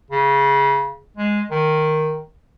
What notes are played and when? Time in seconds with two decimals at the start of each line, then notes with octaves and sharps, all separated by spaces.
0.11 C#3
1.17 G#3
1.51 D#3